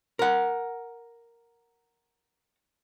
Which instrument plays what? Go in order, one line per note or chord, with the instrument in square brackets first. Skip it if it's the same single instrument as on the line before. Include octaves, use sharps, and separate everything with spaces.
[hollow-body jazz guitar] A#4 F#5